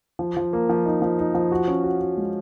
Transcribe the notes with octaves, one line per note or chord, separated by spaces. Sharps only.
F3
F3
A#3
F3
D#4
F3
D#4
F3
F#4
C#4
F#4
F#4
G#3